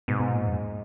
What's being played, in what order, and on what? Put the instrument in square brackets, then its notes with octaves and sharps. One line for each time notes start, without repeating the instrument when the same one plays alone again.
[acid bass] G#2 [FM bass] B2
[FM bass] B2
A#2
F2